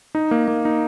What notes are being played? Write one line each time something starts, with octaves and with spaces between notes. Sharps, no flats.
D#4
A#3
A#3
D#4